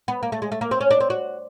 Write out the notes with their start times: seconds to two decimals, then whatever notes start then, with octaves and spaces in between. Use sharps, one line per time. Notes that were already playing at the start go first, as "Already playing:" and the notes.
0.08 B3
0.23 A#3
0.32 A3
0.42 G#3
0.52 A3
0.61 A#3
0.71 C4
0.81 C#4
0.91 D4
1.00 C4
1.10 F#4